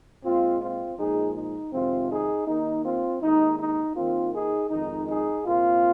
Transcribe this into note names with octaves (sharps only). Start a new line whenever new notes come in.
A#2 G#3 C4 F4
C4 F4
A#2 F3 G#3 D#4 G#4
D#4
F2 C3 D#3 G#3 C4 F4
D#4 G#4
D#2 D#3 A#3 D#4
C4 F4
D#2 D#3 G#3 D#4
D#4
D#2 D#3 A#3 C4 F4
D#4 G#4
F2 D#3 G#3 D#4
D#4 G#4
C2 A#2 A#3 C4 F4